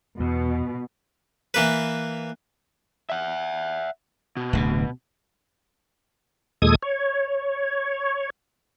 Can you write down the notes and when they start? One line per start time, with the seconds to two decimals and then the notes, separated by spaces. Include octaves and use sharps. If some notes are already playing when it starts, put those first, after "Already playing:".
0.20 E2 B2
1.54 E3 A#3 B4
3.10 E5 F#5
4.37 B2
4.53 D1 D2 C3
6.62 D#2 A#2 G#3 A4 D#6 G#6
6.83 C#5